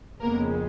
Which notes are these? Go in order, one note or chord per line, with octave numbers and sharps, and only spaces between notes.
F2 C#3 G#3 A#3 B3 A#4